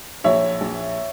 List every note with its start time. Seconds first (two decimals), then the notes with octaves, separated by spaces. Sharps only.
0.24 A#1 C#5 E5
0.61 A#1